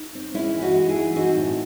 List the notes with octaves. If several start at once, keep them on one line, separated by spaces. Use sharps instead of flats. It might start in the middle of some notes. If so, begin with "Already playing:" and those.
Already playing: D#4
C4
G#3 C#4 E4
E3
D#4 F#4
G#3
E4 G#4
E3
C4 D#4 F#4
A2